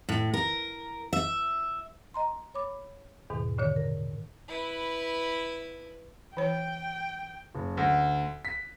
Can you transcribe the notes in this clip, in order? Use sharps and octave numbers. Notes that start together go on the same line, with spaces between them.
A2
A#4
E5
D#5 A#5 C6
C#5 B5 D6
E2 G#2 B2 D#3
A#2 D3 D#3 C#5
A#4
E4 B4
E3 C#5 G5
F#1
D2
B6